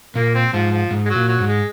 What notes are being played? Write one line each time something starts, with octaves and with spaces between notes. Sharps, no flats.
A#2 A#3
C4
G#2 F3
F3
G#2
G#3
F#3
A#2
F#3
G#2
G#3